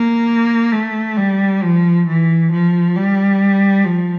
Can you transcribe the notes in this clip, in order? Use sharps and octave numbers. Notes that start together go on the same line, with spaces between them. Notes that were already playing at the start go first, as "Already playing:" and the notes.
Already playing: A#3
A3
G3
F3
E3
F3
G3
F3